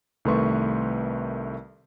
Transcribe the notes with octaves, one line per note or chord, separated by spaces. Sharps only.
C2 D#3 A3 B4 C6 C#6